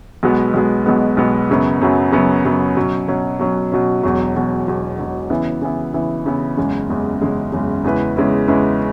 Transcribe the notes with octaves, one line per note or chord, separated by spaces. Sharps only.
B1 B2 G#3 B3
B1 B2 G#3 B3
B1 B2 G#3 B3
B1 B2 G#3 B3
F#2 C#3 F#3 B3
F#2 C#3 F#3 B3
F#2 C#3 F#3 B3
F#2 C#3 F#3 B3
B2 F#3 C#4
B2 F#3 C#4
B2 F#3 C#4
B2 F#3 C#4
E1 E2 B2 F#3
E1 E2 B2 F#3
E1 E2 B2 F#3
E1 E2 B2 F#3
C#3 E3 B3 E4
C#3 E3 B3 E4
C#3 E3 B3 E4
C#3 E3 B3 E4
F#1 E2 C#3 G#3
F#1 E2 C#3 G#3
F#1 E2 C#3 G#3
F#1 E2 C#3 G#3
E2 C#3 G#3 E4 B4
E2 C#3 G#3 E4 B4
E2 C#3 G#3 E4 B4